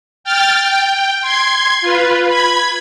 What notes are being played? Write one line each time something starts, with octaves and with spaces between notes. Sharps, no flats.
G5 F6 A6
G5
C6 G#6
F4 B4
B5 G#6